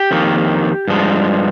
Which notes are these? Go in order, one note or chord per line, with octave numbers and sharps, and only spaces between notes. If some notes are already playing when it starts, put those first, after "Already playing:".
Already playing: G4
F2 D#3 A#3
G2 F3 G#3